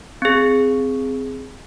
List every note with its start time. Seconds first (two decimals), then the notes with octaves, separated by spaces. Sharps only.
0.22 C4 G#4